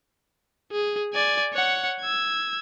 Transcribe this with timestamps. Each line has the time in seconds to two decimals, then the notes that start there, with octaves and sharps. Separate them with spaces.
0.72 G#4
1.14 D5 G#5
1.53 C#5 F#5
2.00 E6 G#6